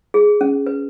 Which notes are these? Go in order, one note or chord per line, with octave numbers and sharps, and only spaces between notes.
G#4
C#4
B4